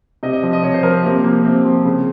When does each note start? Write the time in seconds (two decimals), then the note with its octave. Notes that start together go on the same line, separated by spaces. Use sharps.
0.23 C3 D#5
0.33 D#5
0.43 F3
0.53 D#5
0.63 C3 C#5
0.74 C5
0.83 F3 A#4
0.94 C4
1.04 C3 A#3
1.24 F3 A#3
1.44 C3 C4
1.65 F3
1.85 C#3